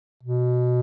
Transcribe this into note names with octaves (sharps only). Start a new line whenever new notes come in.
B2